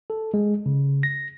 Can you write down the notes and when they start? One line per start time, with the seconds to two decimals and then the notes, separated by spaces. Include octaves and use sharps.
0.10 A4
0.34 G#3
0.66 C#3
1.03 A#6